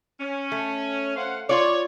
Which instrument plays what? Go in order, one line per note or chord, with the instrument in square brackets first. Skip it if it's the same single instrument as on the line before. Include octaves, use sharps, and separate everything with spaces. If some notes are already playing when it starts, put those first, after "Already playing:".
[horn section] C#4
[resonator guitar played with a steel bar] A3
[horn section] C5 F5 F#5
[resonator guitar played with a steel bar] F4 D5 [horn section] C#5